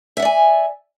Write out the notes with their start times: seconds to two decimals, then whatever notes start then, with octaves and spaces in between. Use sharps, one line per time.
0.17 E5
0.20 F#5
0.22 D5
0.25 G#5